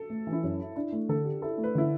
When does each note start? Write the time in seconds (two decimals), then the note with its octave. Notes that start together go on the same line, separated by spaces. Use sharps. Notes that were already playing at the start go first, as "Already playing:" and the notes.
Already playing: A4
0.10 A3
0.27 E3
0.33 E4
0.43 F#2
0.60 E4
0.76 D4 E4
0.92 A3
1.09 D3 A4
1.25 G4
1.42 E4 A4
1.58 A3
1.64 B4
1.75 D3 E4